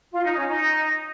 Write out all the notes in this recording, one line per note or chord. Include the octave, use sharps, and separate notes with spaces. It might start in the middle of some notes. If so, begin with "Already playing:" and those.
F4
D#4
C#4
D#4